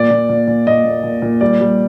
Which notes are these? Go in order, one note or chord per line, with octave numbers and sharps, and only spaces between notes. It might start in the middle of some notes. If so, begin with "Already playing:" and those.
Already playing: A#2 D5
A#2
A#2
A#2
A#2 D#5
A#2
A#2
A#2
G3 D5
G3